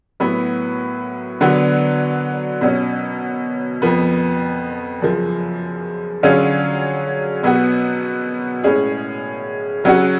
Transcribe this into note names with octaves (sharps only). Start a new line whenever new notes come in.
A2 F#3 B3
D3 F#3 B3 F#4
B2 F#3 C#4
F2 F3 B3
F#2 C#3 F3
D3 F#3 C#4 F4 G#4
B2 F#3 B3 F#4
A2 G#3 C#4 G#4
C#3 F#3 C#4 F#4